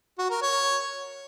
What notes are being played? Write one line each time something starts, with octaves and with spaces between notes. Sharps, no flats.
F#4
A#4
C#5